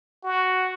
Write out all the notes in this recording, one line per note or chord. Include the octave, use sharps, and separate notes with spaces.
F#4